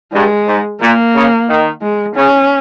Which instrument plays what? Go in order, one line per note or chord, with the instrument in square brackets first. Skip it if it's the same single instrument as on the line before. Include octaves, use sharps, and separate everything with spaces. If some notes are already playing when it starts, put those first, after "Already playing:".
[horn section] G2 [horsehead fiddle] G#3
[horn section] G#2
[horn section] A#2 [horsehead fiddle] A#3
[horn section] C#3
D#3
[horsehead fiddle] G#3
[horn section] C#3 [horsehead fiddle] C#4